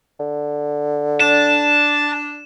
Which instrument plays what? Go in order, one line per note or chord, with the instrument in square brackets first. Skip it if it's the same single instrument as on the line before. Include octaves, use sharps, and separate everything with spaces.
[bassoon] D3
[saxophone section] D4 [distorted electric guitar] A5 [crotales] E7